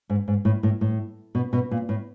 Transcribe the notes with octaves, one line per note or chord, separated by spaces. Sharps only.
G#2
G#2
A2
A2
A2
B2
B2
A#2
A2